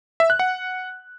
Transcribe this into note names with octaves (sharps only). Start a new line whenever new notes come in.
E5
F#6
F#5